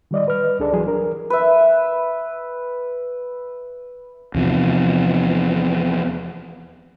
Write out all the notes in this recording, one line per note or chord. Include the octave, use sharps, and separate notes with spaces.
D#3 G3 D5 D#5
B4 F6
C#2 D4 G#4 A4 D5
E3 F#3 E4 G#4
D4 A#4
B4 E5
E2 C3 F3